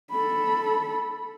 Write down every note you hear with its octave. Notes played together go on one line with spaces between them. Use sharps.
A4 B5